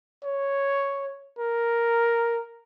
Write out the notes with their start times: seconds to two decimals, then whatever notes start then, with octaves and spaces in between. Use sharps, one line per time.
0.24 C#5
1.39 A#4